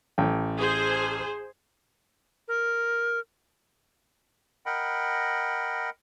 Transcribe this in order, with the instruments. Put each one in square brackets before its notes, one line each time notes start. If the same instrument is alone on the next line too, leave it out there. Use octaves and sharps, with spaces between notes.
[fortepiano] A1 G5
[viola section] G#4 C5
[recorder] A#4
[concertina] A#4 D#5 F#5 G5 B5